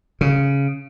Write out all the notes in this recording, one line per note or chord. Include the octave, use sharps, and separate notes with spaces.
C#3